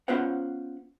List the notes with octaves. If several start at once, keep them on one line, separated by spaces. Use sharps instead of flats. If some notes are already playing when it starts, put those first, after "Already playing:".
B3 C#4 F4 B4 C5 F#5